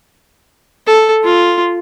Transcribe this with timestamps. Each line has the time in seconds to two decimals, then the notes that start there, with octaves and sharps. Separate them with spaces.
0.87 A4
1.24 F4